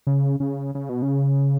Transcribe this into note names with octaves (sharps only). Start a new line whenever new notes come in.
C#3
C#3
C#3
B2
C#3